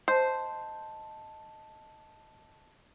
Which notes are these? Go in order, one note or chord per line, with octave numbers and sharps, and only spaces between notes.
C5 D#5 A5